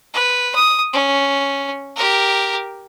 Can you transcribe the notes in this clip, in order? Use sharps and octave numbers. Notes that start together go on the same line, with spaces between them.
B4
D#6
C#4
G4 A#4